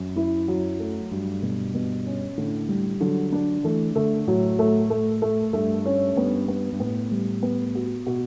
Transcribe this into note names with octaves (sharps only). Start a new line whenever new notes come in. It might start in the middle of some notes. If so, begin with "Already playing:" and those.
Already playing: F#2
E4
F#3
A3
G2 F#3
B2
B2
C#4
A2 D3
G3
D3 F#3
D4
E3 A3
D3 A3
A2 F#3
A3
A3
A3
G2 A3
C#4
G2 B3
B3
G2
A2 B3
G3
B3
F#4
B2 F#4